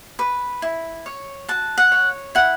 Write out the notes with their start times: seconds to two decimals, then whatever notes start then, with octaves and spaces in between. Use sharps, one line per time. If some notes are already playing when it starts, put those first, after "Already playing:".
0.19 B4
0.62 E4
1.06 C#5
1.48 F#4 A5
1.78 F#5
1.92 C#5
2.35 E4 F#5